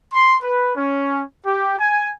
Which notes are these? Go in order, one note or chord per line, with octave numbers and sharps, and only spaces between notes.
C6
B4
C#4
G4
G#5